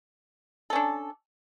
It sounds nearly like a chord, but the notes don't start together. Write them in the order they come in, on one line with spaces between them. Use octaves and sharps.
A4 C#4 D4